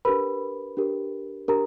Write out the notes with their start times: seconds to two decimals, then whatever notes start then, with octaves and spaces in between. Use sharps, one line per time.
0.05 D4 G4 A#4 B4 B5
0.77 D4 G4 A#4
1.48 D4 G4 A#4 A#5